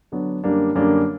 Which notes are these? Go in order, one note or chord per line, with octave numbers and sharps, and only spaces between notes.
D3 F#3 B3 D4
F#2 D3 G3 A#3 D4
F#2 D3 G3 A#3 D4